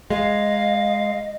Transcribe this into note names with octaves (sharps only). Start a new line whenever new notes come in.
G#3 D#5 F5